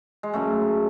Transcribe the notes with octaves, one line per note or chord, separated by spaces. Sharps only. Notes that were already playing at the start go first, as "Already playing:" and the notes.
G#3
F#2 C#3 F#3 A3